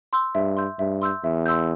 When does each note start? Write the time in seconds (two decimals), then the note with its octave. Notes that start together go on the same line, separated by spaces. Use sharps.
0.13 C6 E6 G6
0.35 G2 E5
0.57 C6 E6 G6
0.79 G2 E5
1.02 C6 E6 G6
1.24 E2 E5
1.46 C6 E6 G6